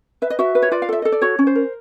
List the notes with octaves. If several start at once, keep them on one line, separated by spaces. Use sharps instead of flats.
B4 E5
D#5
F#4 E5
B4
C#5
F4 D5
F5
A4 E5
A4 D#5
D5
F#4 C#5
C#4
C5
A#4